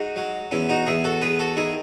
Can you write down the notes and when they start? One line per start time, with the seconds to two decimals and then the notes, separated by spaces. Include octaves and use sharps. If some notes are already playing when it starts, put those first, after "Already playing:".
Already playing: G#2 D#4 F#4
0.16 F#3
0.51 E2 C#4 E4
0.69 D#4 F#4
0.86 E2 E4 G#4
1.04 F#4 A4
1.21 E2 G#4 B4
1.39 F#4 A4
1.57 D#3 E4 G#4